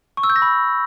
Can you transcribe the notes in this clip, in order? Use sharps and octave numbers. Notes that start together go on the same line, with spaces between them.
C#6
E6
G6
A#6
B5